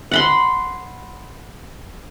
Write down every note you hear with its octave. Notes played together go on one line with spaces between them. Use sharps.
F#5 B5 C6